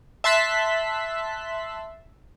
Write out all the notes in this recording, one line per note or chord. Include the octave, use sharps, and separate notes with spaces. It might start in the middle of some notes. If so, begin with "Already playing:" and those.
E5 A5 C6 F#6 B6